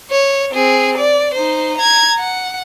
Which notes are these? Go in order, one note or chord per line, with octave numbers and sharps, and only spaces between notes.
C#5
C4 G#4
D5
D#4 C5
A#5 G#6
F#5